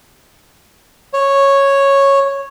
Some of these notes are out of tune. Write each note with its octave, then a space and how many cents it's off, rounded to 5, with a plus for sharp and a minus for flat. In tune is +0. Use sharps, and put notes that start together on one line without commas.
C#5 -5